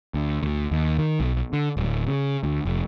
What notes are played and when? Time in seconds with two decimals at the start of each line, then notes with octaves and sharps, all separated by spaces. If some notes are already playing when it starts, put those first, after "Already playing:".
0.14 D2
0.43 D2
0.71 D#2
0.99 D#3
1.20 B1
1.53 D3
1.77 D1
2.08 C#3
2.43 D2
2.65 F1